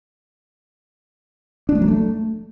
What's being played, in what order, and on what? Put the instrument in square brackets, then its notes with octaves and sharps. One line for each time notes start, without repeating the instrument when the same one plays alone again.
[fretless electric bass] D4
A3
F#3
A3